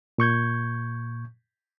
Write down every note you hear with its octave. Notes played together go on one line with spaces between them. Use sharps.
A#2 C#6 G6 G#6